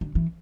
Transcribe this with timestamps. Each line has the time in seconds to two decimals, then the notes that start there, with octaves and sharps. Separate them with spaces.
0.01 D3
0.15 E3